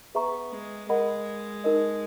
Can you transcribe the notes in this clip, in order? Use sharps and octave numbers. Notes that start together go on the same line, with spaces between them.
B3 G#4 B4 E5 A#5 C#6
G#3
G#3 A#4 D#5 F#5 B5
D#4 A#4 D#5